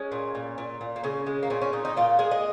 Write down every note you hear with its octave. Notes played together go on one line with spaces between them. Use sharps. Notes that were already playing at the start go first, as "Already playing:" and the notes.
Already playing: G#3 C#4
A#2
A#2
A#2
A#2
A#3
C#3 C#4
G#3
A#3
A#2 C#4
C#4
A#2 D#4
D#4
A#2 F4
G#3 G#4
D#5